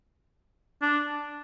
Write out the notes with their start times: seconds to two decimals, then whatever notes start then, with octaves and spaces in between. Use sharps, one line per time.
0.82 D4